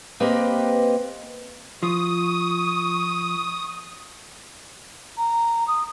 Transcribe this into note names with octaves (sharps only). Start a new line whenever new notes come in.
A#3 C4 G4 B4 D#5
F3 C#6 D#6
A#5
D#6